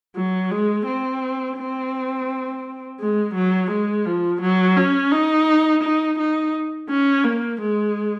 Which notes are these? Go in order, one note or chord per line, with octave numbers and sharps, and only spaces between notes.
F#3
G#3
C4
C4
G#3
F#3
G#3
F3
F#3
C#4
D#4
D#4
D#4
C#4
A#3
G#3